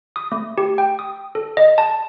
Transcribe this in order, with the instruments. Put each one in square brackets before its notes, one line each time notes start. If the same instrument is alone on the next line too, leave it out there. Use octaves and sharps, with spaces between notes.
[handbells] D#6
A3
G4
G5
D#6
A4
D#5
A5